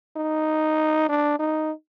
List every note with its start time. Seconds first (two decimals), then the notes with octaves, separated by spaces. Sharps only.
0.17 D#4
1.09 D4
1.39 D#4